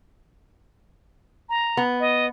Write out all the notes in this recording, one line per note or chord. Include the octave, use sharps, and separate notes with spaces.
A#5
B3
D#5